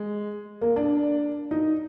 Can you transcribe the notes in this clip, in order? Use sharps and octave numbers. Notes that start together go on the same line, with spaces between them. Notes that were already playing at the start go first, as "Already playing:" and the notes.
Already playing: G#3
A#3
D4
D#4